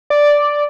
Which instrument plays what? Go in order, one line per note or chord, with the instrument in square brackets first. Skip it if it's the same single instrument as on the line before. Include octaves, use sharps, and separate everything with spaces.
[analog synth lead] D5